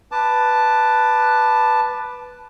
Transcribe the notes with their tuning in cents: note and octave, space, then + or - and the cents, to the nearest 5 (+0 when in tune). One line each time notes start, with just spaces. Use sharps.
B4 +0 A5 +0 D6 +20